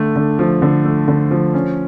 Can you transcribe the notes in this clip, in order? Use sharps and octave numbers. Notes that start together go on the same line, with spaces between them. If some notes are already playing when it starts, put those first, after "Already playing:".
Already playing: D3 A3
D3
F3
D3
A3
D3
F3
C#4